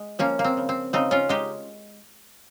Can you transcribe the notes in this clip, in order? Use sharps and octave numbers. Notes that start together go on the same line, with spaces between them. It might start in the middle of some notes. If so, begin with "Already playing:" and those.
Already playing: G#3
F3 A#3 C#4
A#3
C4
C#3
C4
C#3 C4 D#4
C#4 F4
G#3 D#4 G4